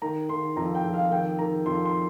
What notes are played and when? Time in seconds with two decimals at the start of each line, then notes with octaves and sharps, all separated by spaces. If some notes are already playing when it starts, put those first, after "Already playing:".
0.02 D#3 A#5
0.29 D#3 C6
0.56 F2 A#5
0.75 G5
0.85 F2
0.94 F5
1.11 D#3 G5
1.39 D#3 A#5
1.66 F2 C6
1.85 C6